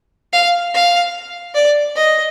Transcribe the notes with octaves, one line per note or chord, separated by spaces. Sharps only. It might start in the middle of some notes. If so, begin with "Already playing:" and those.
F5
F5
D5
D#5